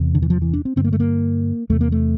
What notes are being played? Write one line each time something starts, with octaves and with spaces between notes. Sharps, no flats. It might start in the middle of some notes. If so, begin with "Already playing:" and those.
Already playing: E2 C3
D3
E3
F3
E3
D4
C4
G2 D3 C4
A#3
A3
A#3
E2 C3 A3
A#3
A3